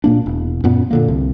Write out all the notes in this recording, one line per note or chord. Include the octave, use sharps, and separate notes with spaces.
A#2 A#3 D4
E1
F#2 A#2 B3
A#2 D3 A#3
C2